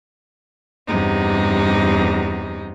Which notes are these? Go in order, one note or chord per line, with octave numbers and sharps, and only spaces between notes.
E2 G2 C3 D#4